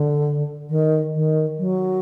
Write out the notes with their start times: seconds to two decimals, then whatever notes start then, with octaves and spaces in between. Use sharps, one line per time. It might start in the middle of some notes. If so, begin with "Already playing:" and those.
Already playing: D3
0.69 D#3
1.14 D#3
1.59 F#3